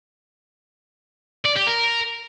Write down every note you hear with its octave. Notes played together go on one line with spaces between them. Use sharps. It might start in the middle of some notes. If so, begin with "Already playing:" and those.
D5
G4
A#4